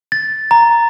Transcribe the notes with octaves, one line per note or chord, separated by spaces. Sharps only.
A6
A#5